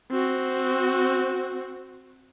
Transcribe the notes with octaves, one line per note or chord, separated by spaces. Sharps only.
C4 F#4